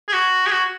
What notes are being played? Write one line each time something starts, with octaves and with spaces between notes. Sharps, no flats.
G#4
F#4
G#4
F#4